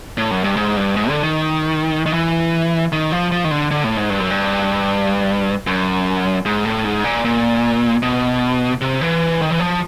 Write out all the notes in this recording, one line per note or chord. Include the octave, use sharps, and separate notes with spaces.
A2
F#2
G2
G#2
G2
G#2
D3
D#3
D#3
E3
D#3
F3
F3
D#3
D3
D3
A2
G#2
G2
F#2
G2
F#2
G#2
A2
G#2
A#2
A#2
B2
C3
E3
D#3
E3
F3